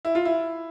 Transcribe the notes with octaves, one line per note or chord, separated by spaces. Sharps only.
E4
F4
E4